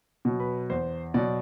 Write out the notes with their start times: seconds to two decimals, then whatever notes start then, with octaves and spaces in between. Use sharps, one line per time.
0.25 B2 F#3
0.40 B4
0.70 E2 C5
1.14 B2 F#3 D5